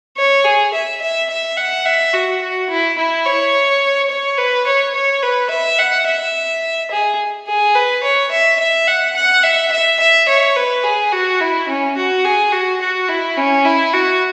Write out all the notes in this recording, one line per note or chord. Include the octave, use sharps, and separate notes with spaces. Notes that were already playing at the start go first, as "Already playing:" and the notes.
C#5
G#4
E5
E5
E5
F#5
E5
F#4
F#4
E4
E4
C#5
C#5
B4
C#5
C#5
B4
E5
F#5
E5
G#4
G#4
B4
C#5
E5
E5
F#5
F#5
E5
E5
E5
C#5
B4
G#4
F#4
E4
C#4
F#4
G#4
F#4
F#4
E4
C#4
E4
F#4